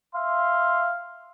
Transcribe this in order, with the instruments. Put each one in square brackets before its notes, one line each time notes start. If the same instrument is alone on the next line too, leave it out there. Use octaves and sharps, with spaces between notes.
[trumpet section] E5 F5 C6